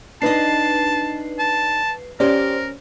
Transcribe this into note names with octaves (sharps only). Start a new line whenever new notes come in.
D4 D#4 B4 D#5 A5 C7
A5
C#4 G4 A#4 C5 D5